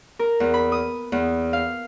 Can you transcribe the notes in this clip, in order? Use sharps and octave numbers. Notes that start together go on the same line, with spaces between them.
A#4
E2
B5
D#6
E2
F5